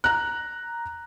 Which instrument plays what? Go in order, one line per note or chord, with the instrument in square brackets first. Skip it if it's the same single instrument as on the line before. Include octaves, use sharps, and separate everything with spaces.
[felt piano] A#5 F#6